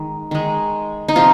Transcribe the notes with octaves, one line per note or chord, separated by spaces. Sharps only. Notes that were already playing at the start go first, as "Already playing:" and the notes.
Already playing: D#3 G#3
D#3 G#3
D#4
C3 F3 F4